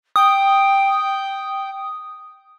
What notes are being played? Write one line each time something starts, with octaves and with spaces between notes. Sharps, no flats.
G5 D#6